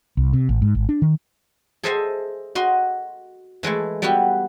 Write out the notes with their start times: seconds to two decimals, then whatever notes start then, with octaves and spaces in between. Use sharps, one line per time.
0.17 C2
0.33 C3
0.49 A1
0.62 G#2
0.75 G#1
0.89 D4
1.02 D#3
1.83 G#4 A4 C5 D#5 E5 G#5
2.55 F#4 D#5 C6
3.63 E3 G#3 A3 E4
4.02 G3 B3 E4 F#4 G4